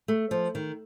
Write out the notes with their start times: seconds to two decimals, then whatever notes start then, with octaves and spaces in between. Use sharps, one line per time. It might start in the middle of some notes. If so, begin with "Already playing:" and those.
0.08 A3
0.31 F3
0.55 D#3